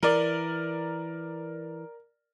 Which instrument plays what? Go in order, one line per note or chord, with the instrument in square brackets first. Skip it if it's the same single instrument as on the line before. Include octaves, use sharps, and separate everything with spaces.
[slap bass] E3 [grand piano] A#4 D5